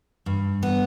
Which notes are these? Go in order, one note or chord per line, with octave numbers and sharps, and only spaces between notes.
G2
B3